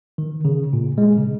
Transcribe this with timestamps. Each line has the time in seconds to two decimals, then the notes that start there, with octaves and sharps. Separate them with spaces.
0.18 D#3
0.45 C#3
0.73 A#2
0.98 G#3
1.17 C#3